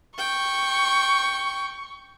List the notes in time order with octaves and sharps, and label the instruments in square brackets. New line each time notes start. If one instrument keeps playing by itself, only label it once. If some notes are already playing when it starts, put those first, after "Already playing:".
[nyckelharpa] G5 [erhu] C#6